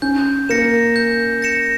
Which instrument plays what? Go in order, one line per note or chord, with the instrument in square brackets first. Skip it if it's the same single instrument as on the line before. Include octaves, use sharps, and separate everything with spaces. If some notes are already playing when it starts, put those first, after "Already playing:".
[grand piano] C#4 [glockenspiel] G6
[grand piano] A#3 [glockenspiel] A#6 C#7 E7
[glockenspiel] G6
A#6 C#7 E7